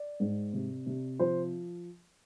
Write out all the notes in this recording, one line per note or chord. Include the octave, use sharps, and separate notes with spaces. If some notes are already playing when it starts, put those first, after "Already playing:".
Already playing: D5
G#2
C3
C3
F3 C5